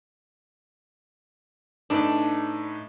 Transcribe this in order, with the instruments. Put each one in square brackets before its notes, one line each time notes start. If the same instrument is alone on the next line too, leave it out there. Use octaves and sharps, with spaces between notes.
[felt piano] A2 D#4 B4 [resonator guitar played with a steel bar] D4